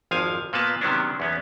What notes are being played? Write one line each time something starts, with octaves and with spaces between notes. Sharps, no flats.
G#1 F2 F3 F5 G#5
A#2 A#3 B3 B4 A5
C3 D#3 F#3 B3 C#4 D4
E2 B3 C#4